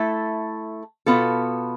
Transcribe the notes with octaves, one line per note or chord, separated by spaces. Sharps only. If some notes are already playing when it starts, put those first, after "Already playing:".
Already playing: A3 E4 A4
B2 B3 F4 A4